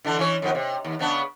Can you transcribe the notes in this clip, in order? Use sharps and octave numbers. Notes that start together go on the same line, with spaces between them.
D3 E3 D4
E3 C#4 C#5
F2 D#3 B3
C3
D#2
C#3 B3 D4